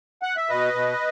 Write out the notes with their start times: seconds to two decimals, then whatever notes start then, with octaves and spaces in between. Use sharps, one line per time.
0.22 F#5
0.37 E5
0.49 B2 B4 D#5
0.74 B2